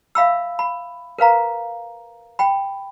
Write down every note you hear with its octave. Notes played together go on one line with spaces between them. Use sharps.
E5 F5 B5 E6
B5
A#4 B4 F5 A#5
G5 B5